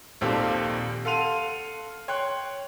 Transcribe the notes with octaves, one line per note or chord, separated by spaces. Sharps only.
A#1 D#2 C4 G4 A4 F5
A4 F5 F#5 C6 D#7 F7
C#5 G5 C6 C#6 F#6